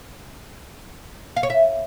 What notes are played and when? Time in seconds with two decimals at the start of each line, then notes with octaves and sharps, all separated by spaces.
1.36 F5
1.43 C#5
1.50 E5